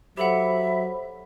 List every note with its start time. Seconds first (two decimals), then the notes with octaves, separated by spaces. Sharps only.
0.17 F#3 G4 A4 C5 E5 F#5 B5